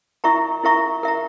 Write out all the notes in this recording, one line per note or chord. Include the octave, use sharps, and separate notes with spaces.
E4 A#4 E5 A#5 C#6
E4 A#4 E5 A#5 C#6
A#4 E5 A#5